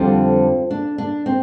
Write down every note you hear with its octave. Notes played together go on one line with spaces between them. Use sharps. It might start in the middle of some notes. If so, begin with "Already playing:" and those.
Already playing: F2 D3 G3 C4 F4
D4
D4
C4